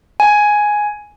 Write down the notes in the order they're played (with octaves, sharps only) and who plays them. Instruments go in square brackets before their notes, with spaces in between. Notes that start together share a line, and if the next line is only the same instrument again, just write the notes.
[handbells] G#5